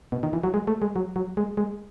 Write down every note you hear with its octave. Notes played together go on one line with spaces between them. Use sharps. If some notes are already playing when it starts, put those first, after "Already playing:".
B2
D#3
E3
F#3
G#3
A3
G#3
F#3
F#3
G#3
G#3